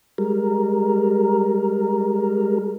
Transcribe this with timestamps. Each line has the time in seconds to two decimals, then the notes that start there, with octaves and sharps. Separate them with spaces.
0.18 G3 G#3 A#4